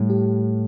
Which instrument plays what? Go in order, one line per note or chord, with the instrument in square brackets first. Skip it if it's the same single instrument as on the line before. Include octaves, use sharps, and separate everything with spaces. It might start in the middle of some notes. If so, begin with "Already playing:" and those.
Already playing: [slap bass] A2 [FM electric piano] G3
[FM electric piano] G4